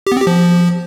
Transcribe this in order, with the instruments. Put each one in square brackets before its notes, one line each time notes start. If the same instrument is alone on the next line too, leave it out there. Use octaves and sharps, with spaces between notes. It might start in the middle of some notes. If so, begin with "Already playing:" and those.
[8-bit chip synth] G4
B3
C4
G4
F3